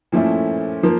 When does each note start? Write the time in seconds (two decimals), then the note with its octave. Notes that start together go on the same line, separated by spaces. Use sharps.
0.12 A#2 F3 A3 C#4 E4
0.83 F3 A#3